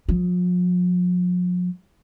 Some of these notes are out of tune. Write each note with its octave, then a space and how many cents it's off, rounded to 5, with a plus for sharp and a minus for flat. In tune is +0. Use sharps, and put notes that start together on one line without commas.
F3 +45